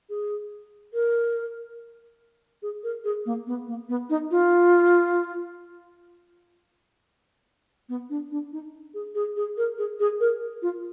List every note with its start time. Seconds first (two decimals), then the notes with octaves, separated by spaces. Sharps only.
0.10 G#4
0.94 A#4
2.62 G#4
2.84 A#4
3.04 G#4
3.26 A#3
3.47 B3
3.67 A#3
3.89 B3
4.10 D#4
4.31 F4
7.89 B3
8.10 D4
8.31 D4
8.52 D#4
8.94 G#4
9.15 G#4
9.37 G#4
9.57 A#4
9.78 G#4
10.00 G#4
10.20 A#4
10.62 F4